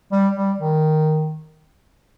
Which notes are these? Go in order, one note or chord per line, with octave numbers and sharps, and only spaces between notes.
G3
G3
D#3